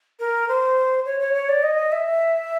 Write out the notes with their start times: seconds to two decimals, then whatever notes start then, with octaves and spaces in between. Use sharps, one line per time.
0.20 A#4
0.48 C5
1.05 C#5
1.20 C#5
1.34 C#5
1.49 D5
1.63 D#5
1.92 E5